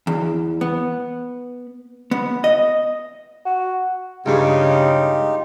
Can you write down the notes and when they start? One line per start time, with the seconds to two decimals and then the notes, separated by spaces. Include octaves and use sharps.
0.07 E2
0.61 B3
2.11 B3
2.44 D#5
3.45 F#4
4.26 C#2 G2 C#3 D#4 F4 G4